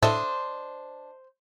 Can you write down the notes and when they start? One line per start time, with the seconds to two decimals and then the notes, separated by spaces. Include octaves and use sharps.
0.03 A2 D4 A4 C5 D#5 E5